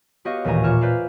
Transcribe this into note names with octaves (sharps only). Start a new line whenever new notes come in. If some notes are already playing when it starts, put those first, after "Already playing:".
B3 F#4 G4 C#5 D#5 F5
A1 D#2 A#2 E3 G#5 A#5
A#2 C#5 D6 F6 E7
B4 C5 D5 F5